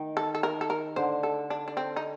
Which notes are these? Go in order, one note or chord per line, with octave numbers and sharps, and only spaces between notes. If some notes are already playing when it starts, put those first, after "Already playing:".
Already playing: D#3
A4
A4
A#4
A4
A#4
D3 C5
A4
D4
D4
C4
D#4